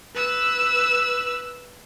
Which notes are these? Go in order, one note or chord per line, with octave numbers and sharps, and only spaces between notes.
B4 E6